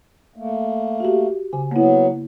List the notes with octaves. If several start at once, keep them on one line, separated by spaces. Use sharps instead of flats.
A3 A#3
F#4 G4
C#3 G#5
F#3 A#3 B3 E4